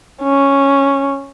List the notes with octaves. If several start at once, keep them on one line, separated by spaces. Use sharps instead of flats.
C#4